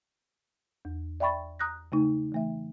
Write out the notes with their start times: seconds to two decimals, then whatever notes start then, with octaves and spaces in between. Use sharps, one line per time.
0.85 E2
1.20 D5 E5 G5 B5 C#6 A6
1.59 A#5 D#6 F#6 G6 A#6
1.92 C#3 A3 D#4
2.32 E3 A3 E5